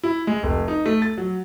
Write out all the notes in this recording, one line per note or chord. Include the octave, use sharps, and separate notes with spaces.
E4
G#3
F1
D#4
A3
A6
F#3